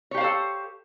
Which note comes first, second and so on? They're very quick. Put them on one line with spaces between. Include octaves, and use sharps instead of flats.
C#5 G4 F5 C5 A4